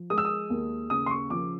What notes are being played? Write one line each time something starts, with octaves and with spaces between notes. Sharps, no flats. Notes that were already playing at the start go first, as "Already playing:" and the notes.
Already playing: F3
G#3 D#6
E6
D#6
D#2
C#3 D#6
C6
C#6
F3 D6